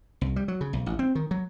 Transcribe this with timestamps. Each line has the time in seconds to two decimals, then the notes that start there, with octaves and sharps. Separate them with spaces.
0.21 C2
0.36 G3
0.48 F#3
0.61 C#3
0.73 B1
0.86 A1
0.99 C4
1.15 D#3
1.31 F#3